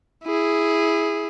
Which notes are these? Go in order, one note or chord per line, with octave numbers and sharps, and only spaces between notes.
E4 G#4